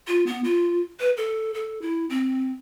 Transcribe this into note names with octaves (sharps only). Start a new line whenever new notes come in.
F4
B3
F4
B4
A4
A4
E4
C4